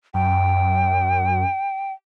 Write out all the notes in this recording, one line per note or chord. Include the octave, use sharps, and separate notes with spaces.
F#2 G5